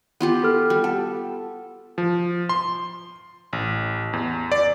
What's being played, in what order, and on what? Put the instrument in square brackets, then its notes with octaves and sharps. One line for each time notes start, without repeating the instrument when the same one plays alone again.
[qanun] B3 F4 G4
[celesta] F#4 A4 F6
[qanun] G3
[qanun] A4 [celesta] F#5
[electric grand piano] F3
C6
A1
E2
D5